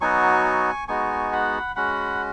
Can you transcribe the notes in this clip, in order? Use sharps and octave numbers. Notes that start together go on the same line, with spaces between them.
F#3 B3 D#4 F#4 G#5 C#6
G#3 B3 D#4 F#4 G#5 C#6
F#5 B5
G#3 C#4 F#4 F#5 B5